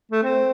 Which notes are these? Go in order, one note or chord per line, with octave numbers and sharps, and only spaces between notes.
A3
C4